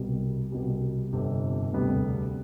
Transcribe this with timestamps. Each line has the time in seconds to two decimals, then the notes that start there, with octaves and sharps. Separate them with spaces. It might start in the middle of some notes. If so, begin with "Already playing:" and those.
Already playing: C2 B2 G3
0.52 C2 B2 G3
1.13 G1 F2 C3
1.72 E1 D2 C3 G3 B3